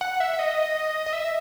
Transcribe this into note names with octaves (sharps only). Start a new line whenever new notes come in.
F#5
E5
E5
D#5
D#5
E5